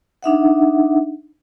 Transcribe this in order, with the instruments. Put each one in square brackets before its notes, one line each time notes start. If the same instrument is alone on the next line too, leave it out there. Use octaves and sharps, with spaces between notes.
[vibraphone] D4 D#4 E5 F#5